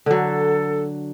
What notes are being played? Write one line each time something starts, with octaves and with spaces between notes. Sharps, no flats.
D3 F#3 A4